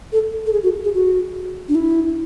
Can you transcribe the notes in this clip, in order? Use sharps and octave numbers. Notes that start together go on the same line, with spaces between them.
A4
A4
G#4
F#4
G#4
F#4
D4
E4